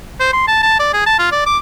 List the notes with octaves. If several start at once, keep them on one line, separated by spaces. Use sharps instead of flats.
C5
C6
A5
A5
D5
G#4
A5
F4
D5
D6